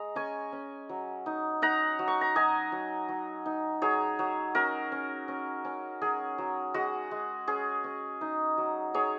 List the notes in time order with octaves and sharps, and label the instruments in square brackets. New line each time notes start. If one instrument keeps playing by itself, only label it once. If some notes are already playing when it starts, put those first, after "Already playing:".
Already playing: [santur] G#3 A#5
C#4 G#5 C#6
C#4
F#3
D#4
D#4 F#5 A#5
F#3
C#6
A#5
F#3 D#5 G#5
F#3
F#3
D#4
F#3 G#4 C#5
F#3
C#4 F#4 A#4
C#4
C#4
C#4
F#3 G#4
F#3
G#3 F#4
G#3
C#4 G#4
C#4
D#4
F#3
F#3 G#4 C#5